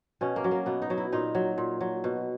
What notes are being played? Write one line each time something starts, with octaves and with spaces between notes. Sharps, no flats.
B2 C#4
A#3
F#3
A#3
B2 B3
D#4
F#3
E4
A#2 D#4
F#3
A#2
F#3
B2